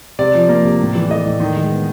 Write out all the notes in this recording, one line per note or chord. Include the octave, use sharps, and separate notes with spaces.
C3 D5
F3
A#3
C3
A2
E3
A3 D#5
A2
D#3
G#3
B3